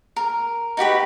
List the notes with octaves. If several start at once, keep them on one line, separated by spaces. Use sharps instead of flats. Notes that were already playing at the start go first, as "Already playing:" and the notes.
A#4
D#4 F#4 G4 B4